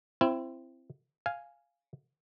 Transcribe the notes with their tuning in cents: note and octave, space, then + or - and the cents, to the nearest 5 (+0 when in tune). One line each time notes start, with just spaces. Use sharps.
C4 +0 E4 +25
F5 +0 G#5 +0